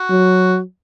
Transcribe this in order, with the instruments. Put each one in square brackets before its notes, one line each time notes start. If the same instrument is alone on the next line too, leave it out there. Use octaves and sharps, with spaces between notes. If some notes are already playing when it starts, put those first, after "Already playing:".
Already playing: [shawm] F#4
[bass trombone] F#3